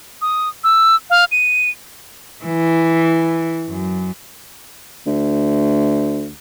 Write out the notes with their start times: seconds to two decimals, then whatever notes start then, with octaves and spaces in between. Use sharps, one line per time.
0.22 D#6
0.64 E6
1.10 F5
1.32 D#7
2.44 E3
3.69 F#2
5.07 D2